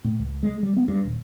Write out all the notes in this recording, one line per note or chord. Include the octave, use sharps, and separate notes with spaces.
A2
C#2
G#3
G3
B3
G2
D#1